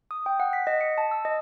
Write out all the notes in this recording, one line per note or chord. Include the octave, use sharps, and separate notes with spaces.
D#6
G5
F#5
B6
D#5
C#7
A5
E6
D#5